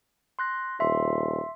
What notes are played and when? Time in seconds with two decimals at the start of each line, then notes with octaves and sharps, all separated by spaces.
0.39 C6 F#6 A#6
0.80 D#1 E5 C6